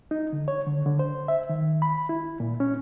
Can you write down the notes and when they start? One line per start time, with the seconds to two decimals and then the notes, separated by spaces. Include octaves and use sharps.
0.11 D#4
0.33 D3
0.48 C#5
0.66 D3
0.86 D3
0.99 C5
1.28 E5
1.49 D#3
1.82 B5
2.09 E4
2.40 A#2
2.60 C#4